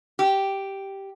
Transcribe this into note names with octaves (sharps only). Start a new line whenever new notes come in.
G4